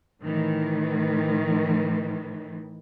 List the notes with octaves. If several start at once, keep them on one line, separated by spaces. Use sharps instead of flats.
A2 D#3 E3